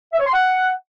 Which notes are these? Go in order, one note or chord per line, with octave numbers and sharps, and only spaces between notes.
E5
C#5
C6
F#5